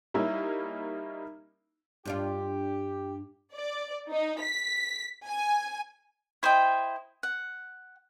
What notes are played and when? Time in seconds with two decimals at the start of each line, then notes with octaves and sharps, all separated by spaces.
0.14 G3 A#3 C#4 D#4 E4
2.05 G2 D4 F4 G4
3.53 D5
4.09 D#4
4.40 B6
5.26 G#5
6.43 E4 C5 D#5 G5
7.23 F#5